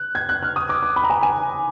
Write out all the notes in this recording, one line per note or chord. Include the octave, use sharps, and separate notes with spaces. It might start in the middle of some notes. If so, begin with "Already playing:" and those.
Already playing: F#6
G#6
F#6
F6
D#6
D6
D6
B5
A#5
G#5
G#5